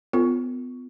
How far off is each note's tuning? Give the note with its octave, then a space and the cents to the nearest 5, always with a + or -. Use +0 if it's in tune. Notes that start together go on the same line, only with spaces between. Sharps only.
B3 +30 F4 +0 A4 +30